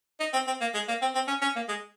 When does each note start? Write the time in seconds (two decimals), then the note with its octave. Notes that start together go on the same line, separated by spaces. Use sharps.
0.20 D#4
0.33 C4
0.47 C4
0.61 A#3
0.74 G#3
0.88 A#3
1.01 C4
1.15 C4
1.28 C#4
1.42 C#4
1.56 A#3
1.68 G#3